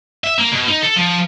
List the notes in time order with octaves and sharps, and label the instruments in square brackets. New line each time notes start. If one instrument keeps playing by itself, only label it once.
[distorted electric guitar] E5
A#3
B2
D#4
A4
F3